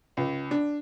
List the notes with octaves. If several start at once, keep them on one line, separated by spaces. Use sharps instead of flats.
C#2
D4